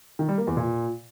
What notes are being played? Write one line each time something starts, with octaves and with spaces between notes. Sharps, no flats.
D#3
G3
A#3
E2
A#2